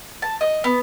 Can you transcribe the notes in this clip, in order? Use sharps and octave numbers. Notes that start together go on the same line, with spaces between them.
A5
D#5
B3